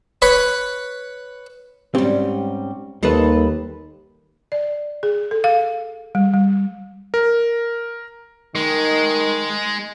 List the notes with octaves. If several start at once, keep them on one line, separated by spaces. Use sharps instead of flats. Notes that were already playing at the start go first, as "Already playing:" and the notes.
B4 C#5 B5 C#6
G#2 G3 C4 C#4 G4
D#2 G3 A4 B4 C5 D#5
D5
G#4
A4
F5
G3
G3
A#4
D#3 G#3